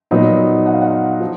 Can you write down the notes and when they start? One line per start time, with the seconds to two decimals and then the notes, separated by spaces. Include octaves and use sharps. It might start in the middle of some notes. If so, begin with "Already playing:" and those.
0.11 A#2 F#3 B3 D#4
0.66 F#5
0.73 F5
0.81 F#5
1.21 F3